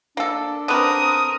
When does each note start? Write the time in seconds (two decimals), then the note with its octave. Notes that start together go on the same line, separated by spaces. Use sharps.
0.17 A#3 D4 A4
0.68 D3 C4 A#4 B4 D#6